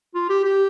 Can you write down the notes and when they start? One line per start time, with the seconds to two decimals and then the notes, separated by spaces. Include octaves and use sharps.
0.15 F4
0.29 G4
0.44 G4